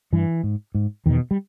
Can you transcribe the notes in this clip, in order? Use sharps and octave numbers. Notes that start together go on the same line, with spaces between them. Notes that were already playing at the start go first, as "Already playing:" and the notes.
G2 E3
G#2
G#2
E2 B2 D#3
G3